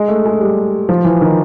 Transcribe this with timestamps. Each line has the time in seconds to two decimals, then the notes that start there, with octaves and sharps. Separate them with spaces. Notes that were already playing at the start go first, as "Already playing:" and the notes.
Already playing: G#3
0.08 A3
0.25 G#3
0.40 G3
0.89 F3
1.05 E3
1.21 D#3